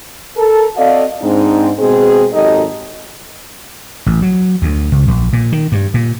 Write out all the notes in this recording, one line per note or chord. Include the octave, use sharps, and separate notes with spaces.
A4 A#4
C4 F#4 A4 D5 D#5 F5
G#2 C4 D4 D#4
B2 G#3 C4 G#4
G#1 F#2 D#4 G4 A4 D#5
A1
F#3
D2
C#2
A#1
A#2
D#3
G2
A#2